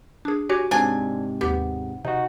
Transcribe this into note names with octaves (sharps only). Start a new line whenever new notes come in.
D4 G#4
F#4 G4 C#5 G#5 D6
G#2 C3 D4 G#5
D#2 B3 G4
C3 D#4 F#4